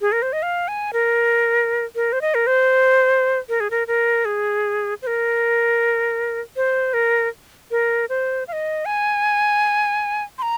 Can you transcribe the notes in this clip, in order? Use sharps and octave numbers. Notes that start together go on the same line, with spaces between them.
G#4
A#4
C5
D#5
F5
G#5
A#4
A#4
C5
D#5
A#4
C5
A#4
G#4
A#4
A#4
G#4
C5
A#4
C5
A#4
A#4
C5
F5
D#5
G#5
C6
A#5